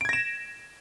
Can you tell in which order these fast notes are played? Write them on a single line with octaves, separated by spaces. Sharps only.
D7 G#6 A#6 E7